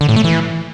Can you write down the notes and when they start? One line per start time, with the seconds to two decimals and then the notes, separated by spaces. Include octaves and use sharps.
0.01 D3
0.09 A2
0.16 A3
0.24 E3